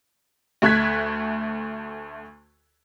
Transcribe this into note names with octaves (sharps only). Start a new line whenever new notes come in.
D2 A3 F#6 G#6 B6